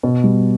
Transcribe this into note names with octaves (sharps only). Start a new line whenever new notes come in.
B2
G3